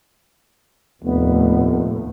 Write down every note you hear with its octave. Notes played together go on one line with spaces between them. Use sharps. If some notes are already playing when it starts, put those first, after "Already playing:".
F1 D#2 A2 B3